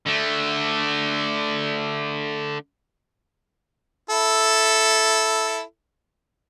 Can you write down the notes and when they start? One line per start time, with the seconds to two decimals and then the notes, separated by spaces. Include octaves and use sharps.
0.06 D3 A3
4.10 E4 A4